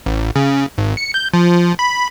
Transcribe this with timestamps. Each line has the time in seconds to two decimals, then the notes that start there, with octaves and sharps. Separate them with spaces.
0.06 A1
0.36 C#3
0.78 G#1
0.97 C#7
1.14 G6
1.34 F3
1.79 B5